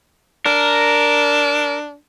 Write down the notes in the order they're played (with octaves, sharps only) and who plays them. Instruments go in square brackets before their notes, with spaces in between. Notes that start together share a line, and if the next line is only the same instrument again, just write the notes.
[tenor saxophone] D4 [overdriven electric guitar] A#4